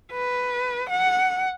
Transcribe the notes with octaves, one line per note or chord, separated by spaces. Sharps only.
B4
F#5